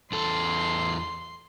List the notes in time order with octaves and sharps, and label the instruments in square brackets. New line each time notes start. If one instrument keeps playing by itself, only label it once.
[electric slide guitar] E2 A4 [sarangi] C6